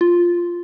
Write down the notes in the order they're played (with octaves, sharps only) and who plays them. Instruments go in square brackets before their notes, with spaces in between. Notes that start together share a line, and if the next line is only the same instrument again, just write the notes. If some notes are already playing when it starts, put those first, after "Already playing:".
[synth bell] F4